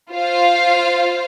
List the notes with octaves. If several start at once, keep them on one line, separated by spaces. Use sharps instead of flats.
F4 C5 F5